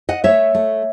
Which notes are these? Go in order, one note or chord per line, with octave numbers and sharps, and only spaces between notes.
D#5 F#5
A3 C#5 E5
A3